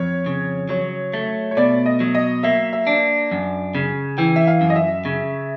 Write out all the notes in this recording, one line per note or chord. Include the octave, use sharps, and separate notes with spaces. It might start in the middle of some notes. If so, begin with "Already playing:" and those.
Already playing: F2 C#5
C#3
F#3 C#5
A3
C#5
B2 D5
D#5
F#3
D#5
A#3 E5
E5
D4
F#2
C#3
E3 G5
E5
F5
F#2
D#5
E5
C#3